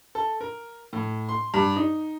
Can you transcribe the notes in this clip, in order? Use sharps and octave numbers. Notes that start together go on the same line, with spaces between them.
A4
A#4
A2
C6
G2
D#4